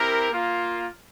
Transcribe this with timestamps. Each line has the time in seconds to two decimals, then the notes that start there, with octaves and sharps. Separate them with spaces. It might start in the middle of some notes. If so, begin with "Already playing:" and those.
Already playing: C4 E4 G4 A#4
0.31 A#3 F4